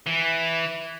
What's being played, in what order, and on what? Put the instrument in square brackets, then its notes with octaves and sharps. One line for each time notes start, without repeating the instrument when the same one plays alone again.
[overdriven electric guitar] E3